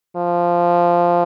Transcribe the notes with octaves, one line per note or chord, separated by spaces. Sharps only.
F3